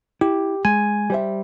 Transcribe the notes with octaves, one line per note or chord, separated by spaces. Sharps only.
E4 G4
G#3 G#5
G3 C5 E5